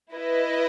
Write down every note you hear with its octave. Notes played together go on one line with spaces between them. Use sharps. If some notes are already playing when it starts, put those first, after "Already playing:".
E4 B4 D#5